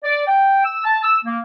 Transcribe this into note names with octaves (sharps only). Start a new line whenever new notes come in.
D5
G5
E6
A5
E6
A#3